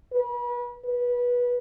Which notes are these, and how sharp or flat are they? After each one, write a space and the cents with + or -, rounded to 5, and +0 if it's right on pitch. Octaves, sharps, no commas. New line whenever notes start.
B4 -35
B4 -20